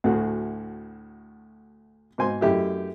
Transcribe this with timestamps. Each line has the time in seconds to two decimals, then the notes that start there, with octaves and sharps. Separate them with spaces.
0.04 D2 A2 A3 F#4 G#4 F#5
2.18 G#2 B2 C5 D#5 G#5 C6
2.41 F#2 A3 E4 G4 D#5 E5